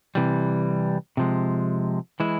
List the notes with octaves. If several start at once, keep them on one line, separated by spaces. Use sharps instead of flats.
C3 E3 G3
C3 F3 G#3
E3 G#3 E4